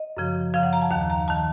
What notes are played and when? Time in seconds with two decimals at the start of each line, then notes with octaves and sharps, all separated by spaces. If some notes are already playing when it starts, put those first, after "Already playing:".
Already playing: D#5
0.17 F#2 C#3 F3
0.54 F#2 C#3 F3 F5
0.63 F#5
0.73 A#5
0.82 A5
0.91 D#2 D#3 F5
1.10 A#5
1.28 D#3 A5